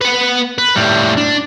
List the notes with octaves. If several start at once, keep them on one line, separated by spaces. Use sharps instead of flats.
B4 F#5
B4
A2 G3
D4